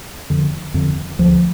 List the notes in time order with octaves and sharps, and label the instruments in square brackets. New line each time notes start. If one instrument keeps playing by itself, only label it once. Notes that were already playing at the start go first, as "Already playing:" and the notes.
[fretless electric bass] F2 D3
F2 D3
D2 D3 F3